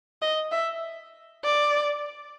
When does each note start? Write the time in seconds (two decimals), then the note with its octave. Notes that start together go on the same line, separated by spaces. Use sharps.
0.22 D#5
0.52 E5
1.44 D5